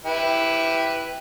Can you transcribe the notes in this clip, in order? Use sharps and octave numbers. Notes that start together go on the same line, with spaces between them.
E4 G4 B4